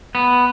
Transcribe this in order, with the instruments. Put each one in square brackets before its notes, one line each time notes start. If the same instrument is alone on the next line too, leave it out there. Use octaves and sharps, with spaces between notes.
[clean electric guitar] B3